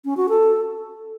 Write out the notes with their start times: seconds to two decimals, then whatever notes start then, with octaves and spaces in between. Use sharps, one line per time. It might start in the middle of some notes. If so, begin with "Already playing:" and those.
0.05 C#4
0.17 F#4
0.29 A4